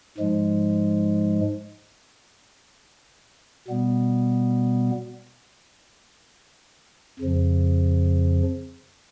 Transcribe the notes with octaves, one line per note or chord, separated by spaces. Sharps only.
G#2 F3 G#3
B2 G3 B3
F2 C#3 F3